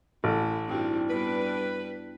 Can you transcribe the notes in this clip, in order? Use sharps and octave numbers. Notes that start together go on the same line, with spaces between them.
A1 E4
G2 G3 C4 D#4 E4 F#4
G3 B3 D4 B4